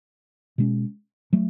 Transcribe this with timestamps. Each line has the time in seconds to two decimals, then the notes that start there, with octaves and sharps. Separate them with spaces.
0.58 B2 G#3 C#4
1.33 F#3 A3